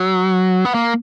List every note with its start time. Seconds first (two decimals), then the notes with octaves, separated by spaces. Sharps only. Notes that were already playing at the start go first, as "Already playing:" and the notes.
Already playing: F#3
0.65 B3
0.74 A#3